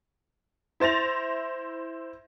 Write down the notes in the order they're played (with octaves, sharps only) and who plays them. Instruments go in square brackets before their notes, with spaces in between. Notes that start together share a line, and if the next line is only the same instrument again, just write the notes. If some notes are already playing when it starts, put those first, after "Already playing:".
[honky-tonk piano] E4 C5 A6 A#6 F7